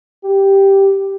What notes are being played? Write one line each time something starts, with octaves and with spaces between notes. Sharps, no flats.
G4